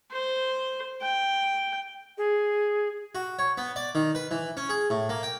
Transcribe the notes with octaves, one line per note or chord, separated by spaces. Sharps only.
C5
G5
G#4
F#4
C#5
B3
D5
D#3
B4
E3
C#4
G#4
A2
A#3
G5